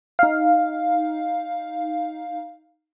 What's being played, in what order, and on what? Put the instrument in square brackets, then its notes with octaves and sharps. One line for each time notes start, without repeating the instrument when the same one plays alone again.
[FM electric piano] D#4 F5